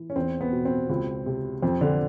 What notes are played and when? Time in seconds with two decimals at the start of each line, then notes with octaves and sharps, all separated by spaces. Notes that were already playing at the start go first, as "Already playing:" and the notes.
Already playing: E3
0.10 C#4
0.16 E2 C4
0.41 B3
0.53 B2
0.65 C4
0.89 C#2
1.26 C3
1.62 F2 C4
1.81 D3 D4